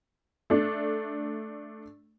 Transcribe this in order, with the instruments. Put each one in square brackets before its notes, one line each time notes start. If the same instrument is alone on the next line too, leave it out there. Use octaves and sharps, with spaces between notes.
[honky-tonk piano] A3 D4